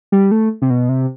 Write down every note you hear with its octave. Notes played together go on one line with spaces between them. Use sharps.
G3
A3
C3
B2
C3